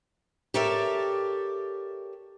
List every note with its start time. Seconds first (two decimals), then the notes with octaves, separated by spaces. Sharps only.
0.54 G4 A4 A#4 C#5 D5 E5